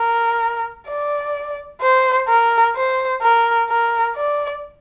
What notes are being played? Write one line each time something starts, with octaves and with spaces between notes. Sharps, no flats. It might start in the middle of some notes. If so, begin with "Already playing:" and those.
Already playing: A#4
D5
C5
A#4
C5
A#4
A#4
D5